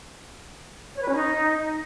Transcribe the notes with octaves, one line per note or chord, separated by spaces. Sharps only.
C#5
B4
C#4
D#4